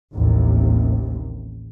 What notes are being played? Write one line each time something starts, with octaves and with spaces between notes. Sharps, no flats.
A1 D#2 C3